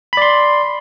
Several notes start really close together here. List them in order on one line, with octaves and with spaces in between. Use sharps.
B5 D5 C6